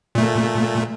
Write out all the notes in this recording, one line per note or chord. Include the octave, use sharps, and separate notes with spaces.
A#2 A3